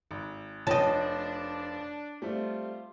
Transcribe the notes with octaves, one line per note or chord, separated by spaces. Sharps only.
G#1
F1 F3 D4 C#5 D#5 G5 A5
G3 A3 C4 F4